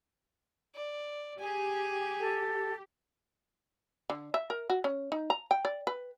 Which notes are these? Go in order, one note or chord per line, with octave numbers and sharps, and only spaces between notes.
D5
G4 G#4 G#5
A4
D3
E5
A#4
F#4
C#4
D#4
A#5
G5
D5
B4